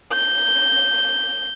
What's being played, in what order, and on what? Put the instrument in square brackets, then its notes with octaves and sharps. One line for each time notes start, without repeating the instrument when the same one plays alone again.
[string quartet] G6